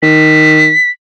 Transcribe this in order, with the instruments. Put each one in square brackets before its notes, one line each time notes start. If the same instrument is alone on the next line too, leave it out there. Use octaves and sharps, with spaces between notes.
[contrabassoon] D#3 [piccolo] B6